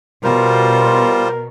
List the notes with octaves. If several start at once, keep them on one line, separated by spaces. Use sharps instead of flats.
B2 G3 F4 A#4 C5